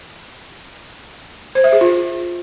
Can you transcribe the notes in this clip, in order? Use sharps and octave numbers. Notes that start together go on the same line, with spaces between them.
C5
E5
G#4
F4